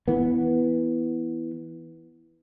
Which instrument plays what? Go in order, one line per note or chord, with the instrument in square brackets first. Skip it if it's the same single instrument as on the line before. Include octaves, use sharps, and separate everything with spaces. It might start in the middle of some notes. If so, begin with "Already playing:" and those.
[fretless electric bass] E3 B3